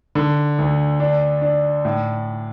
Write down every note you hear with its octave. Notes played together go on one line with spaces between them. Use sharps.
D3
D2
D4
D4
A2